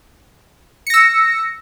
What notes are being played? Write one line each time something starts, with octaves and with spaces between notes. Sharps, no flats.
E6 A#6 C#7